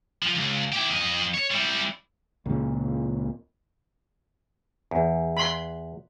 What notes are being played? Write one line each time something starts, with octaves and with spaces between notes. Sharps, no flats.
F3
C#2
E4 G4
F2 D#5
C#5
G3 E4
C#2 A#2
E2
B5 C6